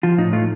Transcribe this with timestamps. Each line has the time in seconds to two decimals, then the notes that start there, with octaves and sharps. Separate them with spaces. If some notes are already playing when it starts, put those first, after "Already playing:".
0.03 F3 F4
0.18 A2 D#4
0.33 A3 F4